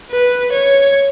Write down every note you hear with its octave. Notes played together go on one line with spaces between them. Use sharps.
B4
C#5